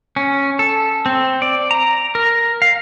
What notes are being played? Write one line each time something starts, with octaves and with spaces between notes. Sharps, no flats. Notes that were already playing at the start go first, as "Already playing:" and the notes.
C#4
A4
C4
D5
A#5
A#4
F5